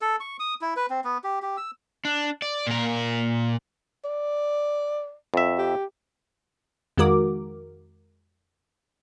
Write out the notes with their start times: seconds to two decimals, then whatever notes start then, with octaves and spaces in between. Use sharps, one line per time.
0.01 A4
0.20 C#6
0.40 D#6
0.61 E4
0.76 B4
0.90 C4
1.04 B3
1.24 G4
1.42 G4
1.57 E6
2.05 D4
2.42 D5
2.67 A#2 A#4
4.05 D5
5.34 F2 E5
5.58 G4
6.98 F2 D#3 G#3 F#4 A#4 D6